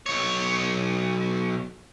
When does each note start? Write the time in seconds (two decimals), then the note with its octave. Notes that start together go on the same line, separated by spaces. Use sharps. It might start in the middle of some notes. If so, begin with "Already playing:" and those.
0.06 B1 C#5